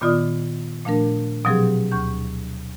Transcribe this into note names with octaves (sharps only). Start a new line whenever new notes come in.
A#2 D#3 B3 F4 D5 D#6
A#2 F3 A3 D4 A#4
B2 F3 F#3 C4 G4 G#4
D2 C#6 G6